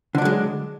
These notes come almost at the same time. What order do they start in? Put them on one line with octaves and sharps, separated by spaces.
D3 D4 F#3 G#3